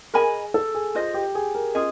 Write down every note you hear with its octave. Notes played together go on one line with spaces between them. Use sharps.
G#4 A#4 D#5 G#5 B5
A4
G#4
F4 G#4 C5 D#5
G4
G#4
A#4
C#4 F4 G#4 D#5